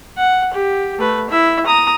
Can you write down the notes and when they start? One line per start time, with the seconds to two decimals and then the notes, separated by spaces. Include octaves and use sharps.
0.17 F#5
0.53 G4
0.99 A3 B4
1.30 E4 E5
1.66 A#5 D#6